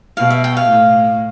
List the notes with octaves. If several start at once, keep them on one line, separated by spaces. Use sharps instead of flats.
B2 F5
E5
G5
F5
A2